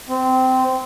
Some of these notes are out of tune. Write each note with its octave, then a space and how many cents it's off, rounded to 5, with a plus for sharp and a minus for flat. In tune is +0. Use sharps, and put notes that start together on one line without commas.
C4 -15